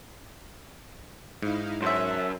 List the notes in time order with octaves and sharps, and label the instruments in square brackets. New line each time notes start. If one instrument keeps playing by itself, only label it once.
[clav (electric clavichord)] G#2 [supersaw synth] D#4 E4 F5
[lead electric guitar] F#2 [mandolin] C5 E5 [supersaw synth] A5 E6 F#6